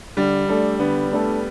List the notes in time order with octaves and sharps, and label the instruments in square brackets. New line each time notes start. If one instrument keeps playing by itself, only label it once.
[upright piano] D3 [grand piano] G3
[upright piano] A3 D4 A4
[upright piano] D3 [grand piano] B3
[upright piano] A3 D4 A4